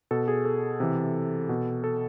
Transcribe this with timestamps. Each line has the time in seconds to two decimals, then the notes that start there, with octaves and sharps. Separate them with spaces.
0.11 B2 A4
0.28 G#4
0.45 A4
0.80 C3 E3
1.49 B2
1.84 A4